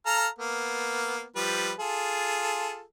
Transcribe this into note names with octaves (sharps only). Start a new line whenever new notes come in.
A4 F5 A#5
A#3 B3
F3 G3 B4
F4 G#4 A4